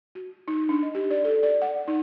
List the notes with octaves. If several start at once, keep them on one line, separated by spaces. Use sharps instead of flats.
F#4
D#4
D4
D#5
G4
D5
A4
D5
F#5
D#4